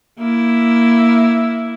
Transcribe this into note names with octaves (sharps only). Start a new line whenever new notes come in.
A#3 E4